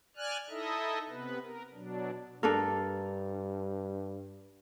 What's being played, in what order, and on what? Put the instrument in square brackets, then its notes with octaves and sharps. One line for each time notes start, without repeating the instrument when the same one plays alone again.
[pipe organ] D5 G#5 F6 F#6
D#4 E4 A4 D#5 E5
C3 B3 B4
A#4
B2 F#3 D4
[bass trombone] G2 [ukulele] D4 A4 A#4